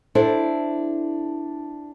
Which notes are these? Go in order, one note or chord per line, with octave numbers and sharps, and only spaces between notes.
D4 E4 A4 C5